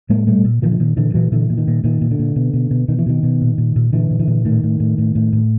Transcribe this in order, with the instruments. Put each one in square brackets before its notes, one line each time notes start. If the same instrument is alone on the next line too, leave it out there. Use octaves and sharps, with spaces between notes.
[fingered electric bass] A2 G#3 A#3
A#2 G3 A3
A#2
A#2 D#3 F3
D3
A#2 D#3
A#2 D3 E3
A#2 E3 F#3
A#2 D3 E3
A#2
D#3
A#2
A#2 D#3
A#2
D3
A#2
B2
B2
B2
B2 D#3
E3
B2 D#3
B2
A#2
A#2
A#2
A#2 D3 E3
A#2
D3 E3
A#2
A2 D#3
A2
A2
A2
A2
A2